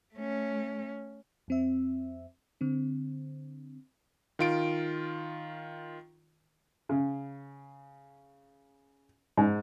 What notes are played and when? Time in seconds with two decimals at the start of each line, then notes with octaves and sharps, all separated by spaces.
0.14 A3 C#4
1.48 F2 C4 E5
2.61 D3 C4
4.39 D#3 F4 D7
6.89 C#3
9.37 G#2